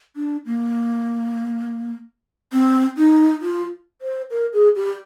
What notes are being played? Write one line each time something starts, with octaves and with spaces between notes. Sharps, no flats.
D4
A#3
C4
D#4
F4
C5
A#4
G#4
G4